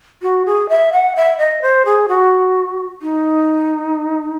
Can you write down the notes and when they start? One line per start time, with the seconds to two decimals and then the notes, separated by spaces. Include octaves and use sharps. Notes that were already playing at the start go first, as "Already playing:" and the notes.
0.22 F#4
0.46 G#4
0.69 E5
0.93 F#5
1.16 E5
1.38 D#5
1.62 C5
1.85 G#4
2.08 F#4
3.02 D#4